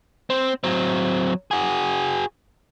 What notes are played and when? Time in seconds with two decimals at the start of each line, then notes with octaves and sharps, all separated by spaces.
0.30 C4
0.64 F#3 C4
1.51 F#4 G#4